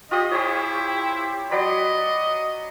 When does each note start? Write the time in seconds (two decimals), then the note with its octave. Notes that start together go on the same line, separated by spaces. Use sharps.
0.11 F4 G4 D#5 D#6
0.31 E4 G4 C5 C#5
1.51 F#3 D5 D#5 B5